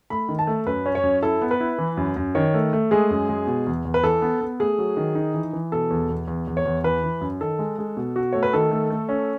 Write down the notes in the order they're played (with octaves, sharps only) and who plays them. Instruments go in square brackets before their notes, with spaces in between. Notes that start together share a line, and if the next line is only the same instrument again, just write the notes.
[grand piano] A3 [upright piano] B5
[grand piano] D#3
[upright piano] A5
[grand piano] A3
[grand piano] F#2 [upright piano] B4
[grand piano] C#4
[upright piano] C#5
[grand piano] F#2
[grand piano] E4 [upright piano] A4
[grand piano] B3
[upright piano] B4
[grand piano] E4
E3
F#2
F#2
[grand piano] D#3 [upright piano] C#5
[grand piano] A3
A3
[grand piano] G#3 [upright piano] G#4
[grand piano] F#2
G#3
B2
E2
E2
[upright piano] B4
[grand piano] E3 [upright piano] A4
[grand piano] B3
B3
[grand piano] A3 [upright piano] G#4
[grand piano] F#3
D#3
D#4
E3
E3
[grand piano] B2 [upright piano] A4
[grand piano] E2
E2
E2
E2
[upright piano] C#5
[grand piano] E2
[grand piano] E3 [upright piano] B4
[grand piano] E3
F#2
[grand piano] D#3 [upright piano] A4
[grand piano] G#3
G#3
B2
F#4
[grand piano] A3 [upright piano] C#5
[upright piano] B4
[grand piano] D#3 [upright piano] A4
[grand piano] A3
A3
C#4